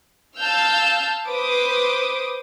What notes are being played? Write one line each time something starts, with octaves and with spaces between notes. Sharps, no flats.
F5 A5 E6 F6 G6
B4 C5 D6 D#6